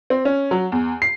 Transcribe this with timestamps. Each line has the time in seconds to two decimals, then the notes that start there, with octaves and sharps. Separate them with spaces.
0.10 C4
0.25 C#4
0.51 F#3
0.72 E2
1.02 C7